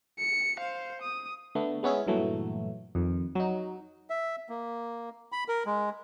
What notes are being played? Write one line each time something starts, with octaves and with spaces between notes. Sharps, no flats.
C#7
C5 F5
D#6
D3 A3 B3
G#3 B3 C#4 E4 G#4
G2 A#2 E3 F#3 A3
F2 D#3
F#3 D#4
E5
A#3
B5
A#4
G#3